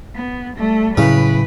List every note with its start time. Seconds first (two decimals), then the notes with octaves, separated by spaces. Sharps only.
0.15 B3
0.56 G3 A3
0.97 A2 C#3 F#3 E4 B4